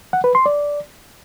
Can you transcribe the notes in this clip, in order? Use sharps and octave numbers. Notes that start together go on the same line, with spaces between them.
F#5
B4
C6
D5